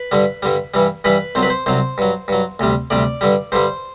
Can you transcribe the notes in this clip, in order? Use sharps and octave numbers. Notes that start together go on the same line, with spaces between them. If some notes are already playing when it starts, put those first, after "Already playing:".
Already playing: B4
G2 D3 G3
G2 D3 G3
G2 E3 G3
G2 E3 G3 B4
C2 C3 F#3 C5
B4
C5
C2 C3 F#3 C5
G2 F#3
G2 F#3
D2 C3 G3
D2 C3 G3 D5
G2 D3 G3
G2 D3 G3 C5